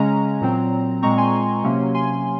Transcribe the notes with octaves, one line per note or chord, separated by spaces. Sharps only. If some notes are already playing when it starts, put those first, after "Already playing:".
Already playing: C#3 G#3 C#4 A#5
A#2 F#3 C4
A#2 G#3 C4 A#5 C#6
G#5 C6
C3 F#3 A#3 C#4
G#5 C6